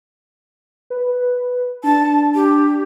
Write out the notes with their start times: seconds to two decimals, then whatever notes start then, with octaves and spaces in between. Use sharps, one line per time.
0.90 B4
1.84 D4 A5
2.35 G4